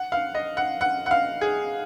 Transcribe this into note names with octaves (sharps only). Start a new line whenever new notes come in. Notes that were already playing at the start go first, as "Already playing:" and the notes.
Already playing: F#5
F5
D#5
F#5
F#5
F#5
F5
G#4